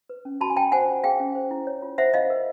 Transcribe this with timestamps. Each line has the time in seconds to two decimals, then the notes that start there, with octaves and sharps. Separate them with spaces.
0.10 B4
0.25 C#4
0.41 F#4 A5 B5
0.50 G#5
0.56 F#4 G5 A5
0.72 C5 F#5 G#5
0.88 F4
1.04 G#4 F5 G5
1.20 C#4
1.35 C5
1.51 E4
1.67 C#5
1.82 F4
1.98 C5 E5 F#5
2.14 F4 D#5 F5
2.30 A#4